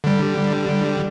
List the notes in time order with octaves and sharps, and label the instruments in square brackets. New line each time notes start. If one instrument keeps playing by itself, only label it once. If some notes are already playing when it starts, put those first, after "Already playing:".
[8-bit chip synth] D3 G3